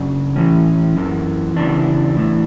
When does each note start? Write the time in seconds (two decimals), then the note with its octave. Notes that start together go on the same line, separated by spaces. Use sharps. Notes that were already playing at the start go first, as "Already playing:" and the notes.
Already playing: F#2 C#3 D4
0.36 A2 E3 C#4
0.97 F#2 E3
1.56 E2 C#3 E3 D4
2.17 A2 E3